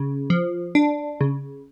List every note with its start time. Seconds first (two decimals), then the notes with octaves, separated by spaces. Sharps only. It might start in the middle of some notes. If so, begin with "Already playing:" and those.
Already playing: C#3
0.30 F3
0.75 D4
1.21 C#3